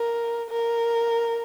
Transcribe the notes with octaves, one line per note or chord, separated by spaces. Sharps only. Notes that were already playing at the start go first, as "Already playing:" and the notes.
Already playing: A#4
A#4